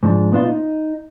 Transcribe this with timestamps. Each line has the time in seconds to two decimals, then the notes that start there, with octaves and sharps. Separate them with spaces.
0.03 G#2 F3 D4
0.32 A#2 B3 D4 F4
0.44 D#4